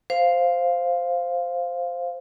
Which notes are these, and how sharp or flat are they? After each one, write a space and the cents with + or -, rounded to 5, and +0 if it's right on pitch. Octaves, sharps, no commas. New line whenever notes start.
C5 +0 F5 +0